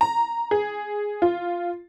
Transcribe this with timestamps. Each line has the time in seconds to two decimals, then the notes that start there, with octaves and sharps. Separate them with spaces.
0.01 A#5
0.51 G#4
1.22 F4